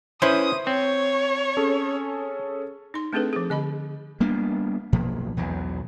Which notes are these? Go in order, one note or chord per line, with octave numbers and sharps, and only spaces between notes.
C#4 E4 B4 C5 D#6
C4 C#5
C#4 G#4 A4
D#4 C6
A3 C4 D4 G#4 A4 B4
F3 G#4
D3 D#5 B5
G3 A#3 B3 D4
B1 B2 F3 A#3
B1 E2 F#3